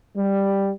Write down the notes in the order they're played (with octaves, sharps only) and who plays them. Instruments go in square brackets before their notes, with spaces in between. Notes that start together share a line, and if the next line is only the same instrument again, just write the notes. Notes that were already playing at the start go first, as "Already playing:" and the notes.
[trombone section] G3